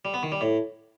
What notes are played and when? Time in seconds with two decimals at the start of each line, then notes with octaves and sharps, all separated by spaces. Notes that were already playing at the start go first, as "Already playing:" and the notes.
0.05 G3
0.14 B3
0.23 D#3
0.32 G3
0.41 A2